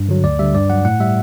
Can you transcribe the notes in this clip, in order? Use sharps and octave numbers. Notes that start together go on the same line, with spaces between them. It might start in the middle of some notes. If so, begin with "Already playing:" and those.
Already playing: G2
D3 F#3
D2 D5
D3 G3 E5
G2 D5
F#3 F#5
A2 F#5
G3 E5